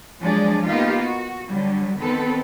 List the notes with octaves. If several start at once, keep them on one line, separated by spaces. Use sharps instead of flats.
F3 F#3 G#3 D4 G#4 D5
A#3 B3 D#4 F4 G4 F5
F#4
D3 F#3 G3
D#3 B3 C4 A4 B4